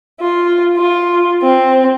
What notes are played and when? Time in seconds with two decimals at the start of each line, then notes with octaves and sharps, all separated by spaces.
0.20 F4
0.77 F4
1.41 C4